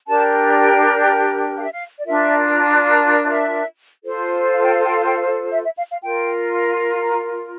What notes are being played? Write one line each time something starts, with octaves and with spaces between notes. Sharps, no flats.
D4 G4 A#4 A5
G5
F5
E5
F5
D5
D4 F4 A#4 E5
D5
D5
E5
F4 A4 C5
F5
G5
F5
G5
F5
G5
F5
E5
E5
F5
F5
F4 A#4 G5
A#5